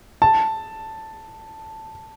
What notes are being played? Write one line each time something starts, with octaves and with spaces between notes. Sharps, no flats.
A5